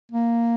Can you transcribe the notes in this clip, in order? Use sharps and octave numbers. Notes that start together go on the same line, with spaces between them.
A#3